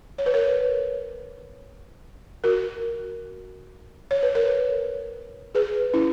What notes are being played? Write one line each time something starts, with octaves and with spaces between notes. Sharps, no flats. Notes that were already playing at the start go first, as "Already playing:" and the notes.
C#5
B4
A#4 C#5
F#4 A#4
C#5
B4
A#4 C#5
G#4 B4
C#4 E4